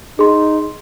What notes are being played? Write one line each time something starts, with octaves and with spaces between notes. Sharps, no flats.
D#4 G#4 C6